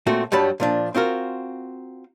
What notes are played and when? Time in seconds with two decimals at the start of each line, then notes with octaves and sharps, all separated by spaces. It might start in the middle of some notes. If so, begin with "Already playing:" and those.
0.06 A#2 A3 C4 F#4
0.32 G2 F#3 G3 A5 B5
0.60 A#2 F3 D4
0.95 C4 F4 F#4 A#4